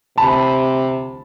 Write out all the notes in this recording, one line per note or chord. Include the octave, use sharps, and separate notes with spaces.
C3 A5 B5